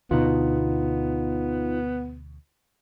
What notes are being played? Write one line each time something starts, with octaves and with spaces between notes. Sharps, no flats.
D2 B2 B3 D#4 F4